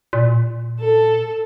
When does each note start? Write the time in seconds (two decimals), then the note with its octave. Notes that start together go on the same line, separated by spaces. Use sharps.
0.13 A#2
0.80 A4